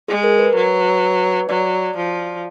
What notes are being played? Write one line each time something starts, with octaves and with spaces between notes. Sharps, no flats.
G#3 G#4
A#4
B4
F#3
F#3 D5
F3